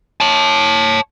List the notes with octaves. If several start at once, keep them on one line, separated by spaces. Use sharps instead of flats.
C#5 A5